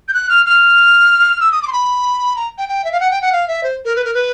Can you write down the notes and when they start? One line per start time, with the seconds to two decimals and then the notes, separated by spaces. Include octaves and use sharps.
0.08 G6
0.14 F#6
0.29 F6
0.46 F6
1.41 E6
1.52 D#6
1.62 D6
1.67 C6
1.73 B5
2.36 A#5
2.58 G5
2.69 G5
2.84 E5
2.92 F5
3.00 F#5
3.11 G5
3.22 F#5
3.32 F5
3.48 E5
3.63 C5
3.85 A#4
3.96 B4
4.04 A#4
4.14 B4